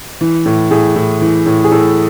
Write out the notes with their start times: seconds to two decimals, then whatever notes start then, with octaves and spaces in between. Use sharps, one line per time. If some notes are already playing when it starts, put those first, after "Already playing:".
0.21 E3
0.45 A2
0.71 A2 G#4
0.96 A2
1.21 E3
1.46 A2
1.64 G#4
1.71 A2 A4